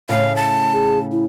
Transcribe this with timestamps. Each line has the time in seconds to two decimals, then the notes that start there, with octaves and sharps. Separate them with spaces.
0.09 A2 C#3 F5
0.36 A5
0.73 G#4
1.12 E4